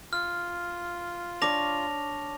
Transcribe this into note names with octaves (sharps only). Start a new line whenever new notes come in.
F4 F6
D4 C#5 D6 A#6 F7